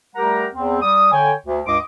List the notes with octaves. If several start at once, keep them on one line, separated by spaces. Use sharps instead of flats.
G3 A3 G4 A#4 F#5 A#5
E2 C4
G3 D#6
D3 C#5 G5 G#5
D2
C#2 G2 D#5 C6 D6